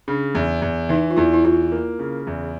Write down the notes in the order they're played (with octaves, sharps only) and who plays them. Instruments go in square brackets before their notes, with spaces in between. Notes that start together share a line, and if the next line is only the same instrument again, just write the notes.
[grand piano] C#3 [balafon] D4
[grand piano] E2
E2
[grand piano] E3 [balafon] D#4
[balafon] F4
[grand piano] E2 [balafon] E4
[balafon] E4
[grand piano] E2 [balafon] F4
[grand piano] A#3
C#3
E2